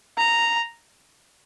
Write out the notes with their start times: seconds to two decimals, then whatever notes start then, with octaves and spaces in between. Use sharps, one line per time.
0.17 A#5